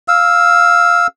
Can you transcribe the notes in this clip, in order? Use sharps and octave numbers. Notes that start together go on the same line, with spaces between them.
F5 E6